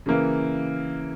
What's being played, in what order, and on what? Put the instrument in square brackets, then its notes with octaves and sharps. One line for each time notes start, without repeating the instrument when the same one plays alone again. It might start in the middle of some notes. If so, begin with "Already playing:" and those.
[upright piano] C#3 E3 A#3